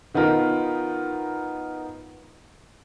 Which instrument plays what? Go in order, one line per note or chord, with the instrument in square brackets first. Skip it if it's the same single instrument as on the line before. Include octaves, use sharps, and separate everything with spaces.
[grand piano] D#3 B3 D#4 F4 A#4